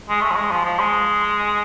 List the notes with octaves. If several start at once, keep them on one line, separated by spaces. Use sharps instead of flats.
G#3
A3
F3
G#3
F3
F3
G#3